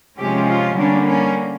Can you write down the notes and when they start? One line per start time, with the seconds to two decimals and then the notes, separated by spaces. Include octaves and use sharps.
0.18 C3 F3 G#3 C#4 G4
0.48 F4
0.78 D3 G3 A#3 C#4 D4
1.07 C#4